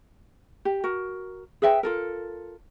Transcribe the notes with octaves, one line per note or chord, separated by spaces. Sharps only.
G4
F#4 A#4
G#4 B4 E5 G5
F4 A4 A#4